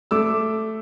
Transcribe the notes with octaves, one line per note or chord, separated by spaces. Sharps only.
A3 D6 E6